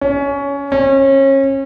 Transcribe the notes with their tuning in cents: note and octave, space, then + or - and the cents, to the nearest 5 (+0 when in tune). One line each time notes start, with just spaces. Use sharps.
C#4 +20
C#4 -30